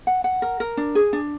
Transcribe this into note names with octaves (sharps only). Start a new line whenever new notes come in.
F#5
F#5
A#4
A#4
D4
G#4
D4